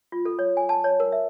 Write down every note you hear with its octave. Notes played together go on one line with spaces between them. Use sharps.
F4
A4
C#5
G#5
A5
C#5
A#4
E5